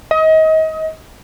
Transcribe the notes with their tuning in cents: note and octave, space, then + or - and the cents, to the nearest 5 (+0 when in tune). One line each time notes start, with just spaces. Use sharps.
D#5 +30